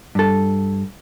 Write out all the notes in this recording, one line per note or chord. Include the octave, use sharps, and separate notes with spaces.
G2 A4